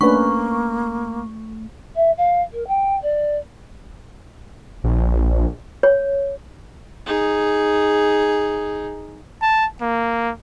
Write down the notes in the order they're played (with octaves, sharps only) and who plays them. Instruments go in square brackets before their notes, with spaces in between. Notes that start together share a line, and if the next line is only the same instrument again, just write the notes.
[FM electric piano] A3 [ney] A#3 [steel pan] C#4 D4 B4 [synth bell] C#6
[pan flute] E5
F5
A#4
G5
D5
[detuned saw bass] A#1
[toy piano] C#5
[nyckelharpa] D#4 G#4
[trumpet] A5
A#3